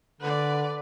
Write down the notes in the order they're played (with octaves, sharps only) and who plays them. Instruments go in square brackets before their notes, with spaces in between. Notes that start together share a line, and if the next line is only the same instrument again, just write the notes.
[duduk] D3 [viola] B4 D5